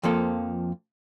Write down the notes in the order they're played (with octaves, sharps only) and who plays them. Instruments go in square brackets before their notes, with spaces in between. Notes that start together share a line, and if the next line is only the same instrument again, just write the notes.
[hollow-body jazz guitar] F2 F3 A#3 A4